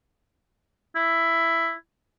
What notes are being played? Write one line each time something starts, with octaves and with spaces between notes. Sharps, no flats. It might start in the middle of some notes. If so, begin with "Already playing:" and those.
E4